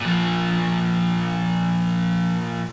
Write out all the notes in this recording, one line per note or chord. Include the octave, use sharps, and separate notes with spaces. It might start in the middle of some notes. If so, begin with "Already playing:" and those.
A#2 F3